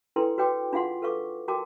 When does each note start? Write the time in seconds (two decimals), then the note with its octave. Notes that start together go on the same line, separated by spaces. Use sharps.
0.16 D4 E4 A4 B4 G5 C6
0.38 F#4 B4 C#5 G5 D6
0.73 D4 F4 G#4 F5 F#5 C6
1.02 A4 B4 F5 C#6 D6
1.48 F#4 A#4 G5 A5 D6